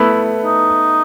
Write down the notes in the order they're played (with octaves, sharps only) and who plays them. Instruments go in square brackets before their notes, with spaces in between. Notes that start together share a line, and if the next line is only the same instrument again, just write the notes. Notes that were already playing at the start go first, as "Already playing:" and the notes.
Already playing: [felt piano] A3 B3 [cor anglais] E4
[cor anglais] D#4